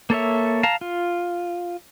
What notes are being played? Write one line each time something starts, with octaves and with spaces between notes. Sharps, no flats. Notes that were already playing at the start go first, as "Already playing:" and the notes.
A#3 A4 C#5 E5
F5 A5 A#5
F4